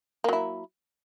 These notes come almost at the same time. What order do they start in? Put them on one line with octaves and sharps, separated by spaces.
A#3 F#3 E4